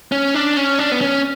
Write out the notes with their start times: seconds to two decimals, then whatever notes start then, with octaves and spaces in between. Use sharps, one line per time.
0.12 C#4
0.34 D4
0.57 C#4
0.79 D4
0.92 B3
1.01 C#4